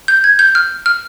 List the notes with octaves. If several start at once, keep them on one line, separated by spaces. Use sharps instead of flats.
G6
G#6
G6
F6
F6